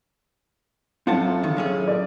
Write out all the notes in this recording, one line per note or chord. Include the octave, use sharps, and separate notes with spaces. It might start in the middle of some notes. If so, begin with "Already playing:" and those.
F#2 A2 C4 F4 F#5 A5
D2 D#3
F#3 C#4 G#4
A#2 D5